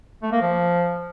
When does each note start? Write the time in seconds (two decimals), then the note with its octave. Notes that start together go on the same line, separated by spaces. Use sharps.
0.23 A3
0.32 A#3
0.41 F3